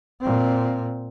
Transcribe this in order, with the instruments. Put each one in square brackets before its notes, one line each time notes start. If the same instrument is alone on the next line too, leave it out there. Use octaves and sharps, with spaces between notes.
[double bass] A#2 C4